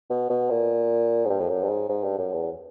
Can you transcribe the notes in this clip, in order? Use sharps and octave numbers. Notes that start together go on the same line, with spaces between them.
B2
B2
A#2
G#2
G2
F2
F#2
G2
G#2
G#2
G2
F#2
E2